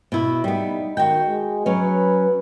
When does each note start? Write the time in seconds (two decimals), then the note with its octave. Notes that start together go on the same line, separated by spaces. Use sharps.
0.12 B2 E4
0.44 G3 B3 D#4
0.97 D#3 F#4 G5
1.27 G#3
1.66 F#3 C#4 B4